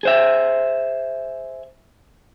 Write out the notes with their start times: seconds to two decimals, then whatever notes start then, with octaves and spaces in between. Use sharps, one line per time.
0.03 G#4 C5 E5